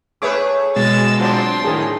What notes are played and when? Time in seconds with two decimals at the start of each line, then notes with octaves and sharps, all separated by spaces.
0.22 A3 G#4 B4 C#5 E5 D6
0.76 B2 G#3 E6 A6
1.19 F#3 C4 D4 F4 C5 D5 C6
1.64 A2 D#3 G#4 A#4